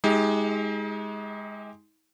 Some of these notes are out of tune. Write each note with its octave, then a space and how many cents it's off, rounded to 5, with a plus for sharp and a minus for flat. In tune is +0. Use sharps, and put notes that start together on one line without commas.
G#3 +0 D#4 +40 G4 +5